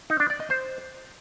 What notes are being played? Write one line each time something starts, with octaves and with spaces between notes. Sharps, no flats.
D#4
D4
D5
D#5
C5